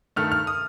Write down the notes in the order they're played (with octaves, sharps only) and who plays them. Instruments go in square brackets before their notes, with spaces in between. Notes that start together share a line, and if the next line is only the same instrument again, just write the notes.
[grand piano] G2 D#3 A3 F6
F6
D#6